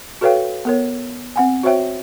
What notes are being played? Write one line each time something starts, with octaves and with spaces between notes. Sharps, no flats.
F#4 A4 B4 C#5 F5 G5
B3 A#4 C#5
C4 F#5 G#5
F#4 C5 C#5 E5 G5